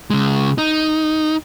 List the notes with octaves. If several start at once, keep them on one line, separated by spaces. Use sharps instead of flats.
C#3 G#3
D#4